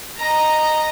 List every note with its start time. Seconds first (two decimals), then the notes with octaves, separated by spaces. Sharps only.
0.18 D#5 A#5